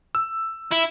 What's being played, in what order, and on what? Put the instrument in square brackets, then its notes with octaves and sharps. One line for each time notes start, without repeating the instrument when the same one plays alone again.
[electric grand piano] E6
[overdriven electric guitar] E4